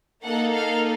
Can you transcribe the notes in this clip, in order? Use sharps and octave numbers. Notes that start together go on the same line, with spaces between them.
A#3 D#4 A4 F#5
F5